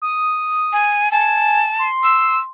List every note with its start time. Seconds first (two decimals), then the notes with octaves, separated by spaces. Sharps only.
0.02 D#6
0.73 G#5
1.12 G#5 A5
1.79 C6
2.03 E6